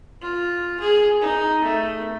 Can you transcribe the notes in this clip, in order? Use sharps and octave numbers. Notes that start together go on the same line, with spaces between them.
F4
G#4
D#4
A3